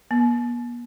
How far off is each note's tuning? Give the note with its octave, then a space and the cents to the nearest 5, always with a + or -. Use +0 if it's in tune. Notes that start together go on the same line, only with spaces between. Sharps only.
B3 -45